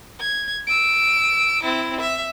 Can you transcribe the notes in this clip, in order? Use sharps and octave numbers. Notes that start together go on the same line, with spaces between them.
G#6
E6 D7
C4 E4
E5